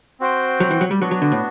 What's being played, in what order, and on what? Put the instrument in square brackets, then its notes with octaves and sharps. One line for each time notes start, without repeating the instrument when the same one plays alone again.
[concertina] C4 F#4 C5 G5
[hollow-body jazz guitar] F#3
E3
F#3
G3
[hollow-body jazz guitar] F#3 [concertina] B3 D4 F#4
[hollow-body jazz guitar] F#3
D3
A2